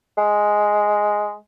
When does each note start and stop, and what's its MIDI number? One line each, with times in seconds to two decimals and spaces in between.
0.18 1.36 56